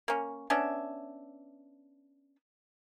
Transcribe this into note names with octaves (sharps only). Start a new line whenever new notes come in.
A#3 C#4
B3 C#4 D4 E5